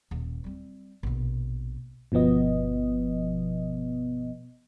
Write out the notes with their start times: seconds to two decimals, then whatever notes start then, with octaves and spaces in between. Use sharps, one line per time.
0.11 D#1
0.44 G3 C4
1.03 A#1 B2
2.12 G1 B2 F3 B3 D#5